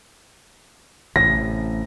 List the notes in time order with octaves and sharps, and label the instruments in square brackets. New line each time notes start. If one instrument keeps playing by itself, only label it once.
[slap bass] A1 C3 [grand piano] A#6